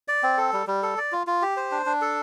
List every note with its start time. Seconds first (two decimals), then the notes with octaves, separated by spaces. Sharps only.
0.08 D5
0.23 C4
0.38 A4
0.53 G3
0.67 G3
0.83 A4
0.97 D5
1.12 F4
1.27 F4
1.42 G4
1.57 C5
1.72 D4
1.86 D4
2.01 A4